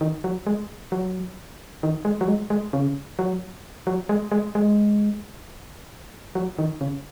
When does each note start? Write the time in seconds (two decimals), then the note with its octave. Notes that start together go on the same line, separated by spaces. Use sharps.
0.01 D#3
0.24 F#3
0.47 G#3
0.92 F#3
1.83 D#3
2.05 G#3
2.21 F#3
2.28 G#3
2.50 G#3
2.73 C#3
3.19 F#3
3.87 F#3
4.09 G#3
4.32 G#3
4.55 G#3
6.35 F#3
6.58 D#3
6.81 C#3